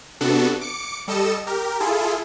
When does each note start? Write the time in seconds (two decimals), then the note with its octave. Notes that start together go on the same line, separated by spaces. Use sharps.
0.21 C3 B3 D4 F#4 A4
0.61 D6 C#7
1.08 G3 A4 D#5 C#7 E7
1.47 G4 A#4
1.80 E4 F4 G#4 A4